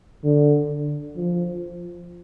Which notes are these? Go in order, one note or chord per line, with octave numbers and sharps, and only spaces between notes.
D3
F3